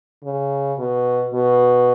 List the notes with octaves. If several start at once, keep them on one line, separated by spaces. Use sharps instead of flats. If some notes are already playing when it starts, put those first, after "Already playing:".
C#3
B2
B2